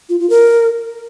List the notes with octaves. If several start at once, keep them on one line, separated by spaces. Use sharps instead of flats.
F4
F4
A#4